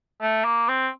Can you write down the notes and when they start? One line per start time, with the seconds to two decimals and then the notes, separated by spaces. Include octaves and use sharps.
0.22 A3
0.45 A#3
0.68 C4